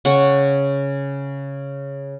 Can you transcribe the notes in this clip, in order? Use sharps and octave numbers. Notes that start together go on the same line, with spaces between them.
C#3 F#5 C#6